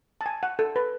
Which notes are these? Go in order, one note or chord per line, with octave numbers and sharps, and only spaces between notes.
A5
G#5
F#5
A4
B4